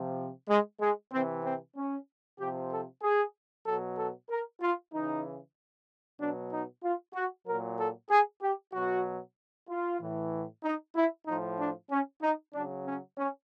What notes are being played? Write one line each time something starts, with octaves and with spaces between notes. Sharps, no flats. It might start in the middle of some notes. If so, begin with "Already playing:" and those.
Already playing: C3 F3
G#3
G#3
C3 E3 C4
C4
C#4
C3 F3 G4
A4
G#4
B2 F#3 A4
A4
A#4
F4
C#3 E3 D#4
B2 F#3 D4
D#4
F4
F#4
A#2 F#3 A#4
A4
G#4
G4
B2 F#3 F#4
F4
A2 E3
D#4
E4
A2 F3 D#4
D4
C#4
D#4
C#3 F#3 D4
C#4
C#4